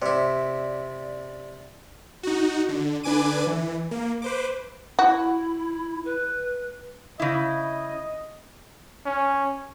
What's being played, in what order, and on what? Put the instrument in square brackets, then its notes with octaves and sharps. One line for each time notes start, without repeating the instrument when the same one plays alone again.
[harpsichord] C3 E4 [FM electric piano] D5
[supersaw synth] D#4 F#4
D3
D3 D4 B4 G#5 D6 D#7
E3
A#3
B4 C5 D6
[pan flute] E4 [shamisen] F#4
[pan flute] B4
[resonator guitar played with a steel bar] C#3 E4 [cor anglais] D#5
[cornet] C#4